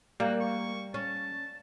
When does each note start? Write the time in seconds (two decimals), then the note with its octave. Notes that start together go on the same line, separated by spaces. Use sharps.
0.20 G3 A#3 F#4
0.40 C#6
0.94 C#4 A5